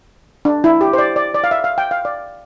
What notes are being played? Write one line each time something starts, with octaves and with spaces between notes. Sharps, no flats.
D4
E4
G4
C5
D5
D5
D5
F5
E5
F5
G5
F5
D5